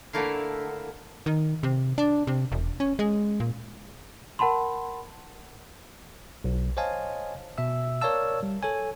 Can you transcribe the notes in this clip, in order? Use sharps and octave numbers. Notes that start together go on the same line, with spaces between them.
D3 A3 A#3 E4 F5
D#3
C3
D4
C3
E1
C#4
G#3
A#2
A#4 F#5 A5 B5 C6
B1
C5 C#5 D#5 F5 G#5 A5
B2 E5 E6
A#4 C#5 D5 F5 A5 E6
G3
A4 C#5 G#5